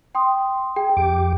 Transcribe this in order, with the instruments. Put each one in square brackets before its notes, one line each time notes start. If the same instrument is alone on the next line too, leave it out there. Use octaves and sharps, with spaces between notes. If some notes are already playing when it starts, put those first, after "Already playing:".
[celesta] G5 C6 D#6
[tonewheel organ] G#4 [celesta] G5
[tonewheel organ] F2 G4 D6